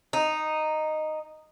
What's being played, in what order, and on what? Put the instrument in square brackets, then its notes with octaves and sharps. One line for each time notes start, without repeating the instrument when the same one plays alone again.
[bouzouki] D#4